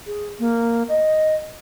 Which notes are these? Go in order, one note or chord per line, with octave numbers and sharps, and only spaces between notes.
G#4
A#3
D#5